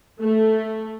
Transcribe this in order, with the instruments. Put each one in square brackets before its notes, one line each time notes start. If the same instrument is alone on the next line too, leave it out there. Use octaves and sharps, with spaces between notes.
[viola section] A3